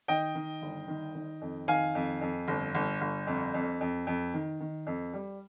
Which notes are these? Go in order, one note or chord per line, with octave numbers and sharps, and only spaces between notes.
D#3 D#5 G5
D#3
G1
D#3
D#3
F2
D#3 F5 G#5
F2
F2
G1
G1
G1
F2
F2
F2
F2
D#3
D#3
F2
G3